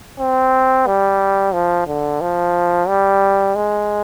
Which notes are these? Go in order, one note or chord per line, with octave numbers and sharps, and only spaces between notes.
C4
G3
F3
D3
F3
G3
G#3